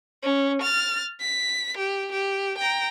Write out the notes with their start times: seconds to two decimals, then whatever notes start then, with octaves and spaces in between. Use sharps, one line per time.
0.23 C#4
0.62 F6 A6
1.20 B6
1.77 G4
2.12 G4
2.58 G5 A#5